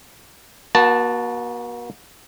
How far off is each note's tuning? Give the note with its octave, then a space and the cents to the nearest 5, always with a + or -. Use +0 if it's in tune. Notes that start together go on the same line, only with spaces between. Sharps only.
A#3 +45 F#4 +0 A5 +0